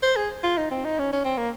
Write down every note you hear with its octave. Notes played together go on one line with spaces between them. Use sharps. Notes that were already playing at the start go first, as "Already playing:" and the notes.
C5
G#4
F4
D#4
C4
D#4
C#4
C#4
C4
A#3